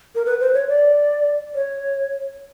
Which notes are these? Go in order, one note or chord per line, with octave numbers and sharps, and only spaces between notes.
A#4
B4
C5
C#5
D5
C#5